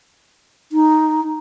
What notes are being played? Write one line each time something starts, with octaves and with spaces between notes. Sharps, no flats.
D#4